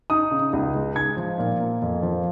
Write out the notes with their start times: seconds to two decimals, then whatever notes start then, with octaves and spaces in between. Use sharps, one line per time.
0.10 D#4 D#6
0.31 C#3
0.53 C#2
0.75 G#3
0.96 D#4 G#6
1.17 F3
1.38 A#2
1.60 A#3
1.82 F2
2.03 F3